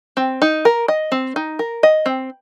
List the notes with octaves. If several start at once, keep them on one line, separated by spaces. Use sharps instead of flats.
C4
D#4
A#4
D#5
C4
D#4
A#4
D#5
C4